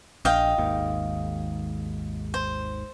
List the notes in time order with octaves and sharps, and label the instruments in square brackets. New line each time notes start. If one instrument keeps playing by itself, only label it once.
[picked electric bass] A#1 [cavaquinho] D#5 F5 G5
[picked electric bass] G#1 D#2 G#2
[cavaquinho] C5